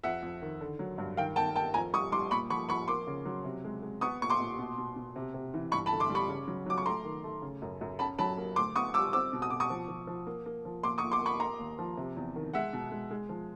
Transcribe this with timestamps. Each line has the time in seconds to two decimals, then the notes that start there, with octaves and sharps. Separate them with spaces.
0.03 F2 E5 F#5
0.22 F2
0.42 D#3
0.61 D3
0.79 F#3
0.98 G2
1.17 D#3 F5 G5
1.36 D#3 G5 A5
1.56 A#3 G5 A5
1.74 F2 G#5 A#5
1.93 G3 C#6 D#6
2.12 G3 C6 D6
2.31 A#2 B5 C#6
2.50 F3 B5 C#6
2.69 F3 B5 C#6
2.88 A#3 C6 D6
3.07 C#3
3.26 F#3
3.44 C3
3.64 G#3
3.82 G#3
4.01 B3 C#6 D#6
4.21 A#2 C#6
4.30 C6 D6
4.40 A#2
4.59 B2
4.78 B2
4.96 B2
5.16 C3
5.34 C3
5.54 E3
5.72 G2 B5 C#6
5.86 A5 B5
5.92 D3
6.00 C6 D6
6.10 G3
6.15 B5 C#6
6.29 C#3
6.47 F#3
6.66 F#3 D6
6.78 C#6
6.86 A3 A#5 C6
7.05 D#3
7.24 A3
7.42 C#3
7.62 F#2
7.81 F#2
7.99 C#4 A5 B5
8.19 F#3 A5 B5
8.37 A#3
8.56 D2 C6 D6
8.76 B3 C#6 D#6
8.94 G3 D6 E6
9.13 C4 D6 E6
9.33 B2
9.42 D#6
9.50 B2 D6
9.60 C#6 D#6
9.70 F3
9.88 F3
10.07 F3
10.27 A#3
10.46 A#3
10.65 F3
10.83 A#2 C6 D6
10.98 C#6 D#6
11.03 A#2
11.11 C6 D6
11.21 A#3 B5 C#6
11.40 A#3 A#5 C6
11.59 D#2
11.79 F3
11.97 C3
12.16 E2
12.36 D#3
12.54 G#3 E5 F#5
12.73 B2
12.91 G#3
13.11 G#3
13.29 F3